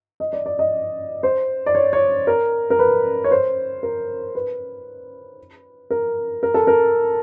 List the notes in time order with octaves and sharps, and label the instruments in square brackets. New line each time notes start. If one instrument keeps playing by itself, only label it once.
[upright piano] D#5
D5
D5
D#5
C5
D5
C#5
C#5
A#4
A#4
B4
C#5
C5
A#4
B4
A#4
A#4
A4
A#4